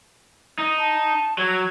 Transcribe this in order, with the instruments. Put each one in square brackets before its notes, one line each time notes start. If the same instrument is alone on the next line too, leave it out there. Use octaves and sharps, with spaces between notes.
[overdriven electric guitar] D#4
[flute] A5
[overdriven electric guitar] F#3 [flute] G#6